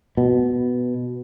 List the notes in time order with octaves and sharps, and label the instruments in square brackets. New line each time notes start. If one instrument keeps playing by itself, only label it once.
[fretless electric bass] B2